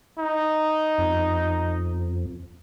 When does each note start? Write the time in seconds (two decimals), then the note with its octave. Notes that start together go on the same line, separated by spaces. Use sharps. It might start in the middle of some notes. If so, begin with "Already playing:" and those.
0.19 D#4
0.98 F2